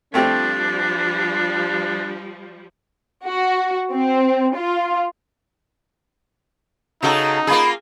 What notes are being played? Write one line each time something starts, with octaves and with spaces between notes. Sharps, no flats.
F3 G3 A3 C4 D4 G4
F#4
C4
F4
C#3 D#4 F#4 A4 A#5
A#3 F4 G#4 B5